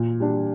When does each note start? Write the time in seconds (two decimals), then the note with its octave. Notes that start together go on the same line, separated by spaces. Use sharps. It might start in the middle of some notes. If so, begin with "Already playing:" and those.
Already playing: A#2
0.20 G3 D4